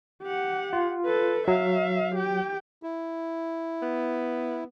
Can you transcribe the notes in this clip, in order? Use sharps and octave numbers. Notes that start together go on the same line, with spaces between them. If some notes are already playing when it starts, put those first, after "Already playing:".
G4 F#5
F4
A4 B4
F#3 E5 F5
G4 G5
E4
B3